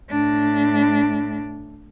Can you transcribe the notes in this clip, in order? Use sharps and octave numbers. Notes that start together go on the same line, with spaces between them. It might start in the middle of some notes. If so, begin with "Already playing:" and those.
A2 D4